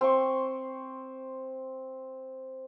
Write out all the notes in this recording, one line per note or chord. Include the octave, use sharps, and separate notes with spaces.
C4 C6 C#6